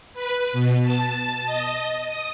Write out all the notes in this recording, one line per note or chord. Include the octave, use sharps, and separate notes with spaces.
B4
B2
A5
D#5
D#6